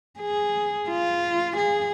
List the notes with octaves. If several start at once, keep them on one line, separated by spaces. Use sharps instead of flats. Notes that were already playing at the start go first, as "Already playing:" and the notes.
G#4
F4
G#4